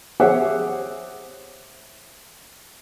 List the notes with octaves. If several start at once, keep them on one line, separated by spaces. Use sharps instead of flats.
G4 G#4 C5 C#5 E5 F#5